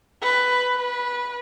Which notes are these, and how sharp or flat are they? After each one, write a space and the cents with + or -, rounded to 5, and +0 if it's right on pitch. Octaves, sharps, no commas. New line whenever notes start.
B4 +10
B4 -20